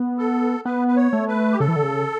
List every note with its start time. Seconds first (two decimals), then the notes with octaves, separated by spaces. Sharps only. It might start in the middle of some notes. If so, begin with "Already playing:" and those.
Already playing: B3
0.18 A4
0.65 B3 B4
0.88 B4
0.96 C#5
1.13 A3
1.28 B4
1.53 G4
1.59 C#3 A4
1.68 E3
1.76 D3
1.83 C#3